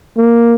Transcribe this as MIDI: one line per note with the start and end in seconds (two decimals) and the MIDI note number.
0.17 0.55 58